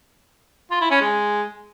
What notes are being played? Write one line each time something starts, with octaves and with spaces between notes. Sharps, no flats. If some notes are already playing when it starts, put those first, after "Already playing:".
F4
E4
C#4
G#3